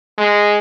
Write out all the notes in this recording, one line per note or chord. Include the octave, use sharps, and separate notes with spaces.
G#3